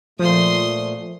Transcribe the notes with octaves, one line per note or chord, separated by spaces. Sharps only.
A#2 F3 A3 C6 D#6